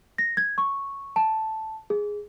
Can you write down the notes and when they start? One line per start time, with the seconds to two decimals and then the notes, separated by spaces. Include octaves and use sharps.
0.18 A#6
0.37 G#6
0.58 C#6
1.16 A5
1.90 G#4